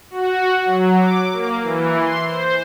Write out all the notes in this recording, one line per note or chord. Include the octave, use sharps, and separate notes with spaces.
F#4
F#3
D6
A#3
E3
C6
C5